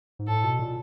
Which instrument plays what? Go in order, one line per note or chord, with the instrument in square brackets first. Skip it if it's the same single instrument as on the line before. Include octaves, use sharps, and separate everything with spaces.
[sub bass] G#2
[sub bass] A2 [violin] A4
[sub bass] B2
A#2